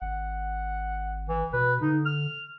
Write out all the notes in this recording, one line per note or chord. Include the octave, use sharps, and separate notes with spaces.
G#1 F#5
E3
B2 B4
D3 D#4
F6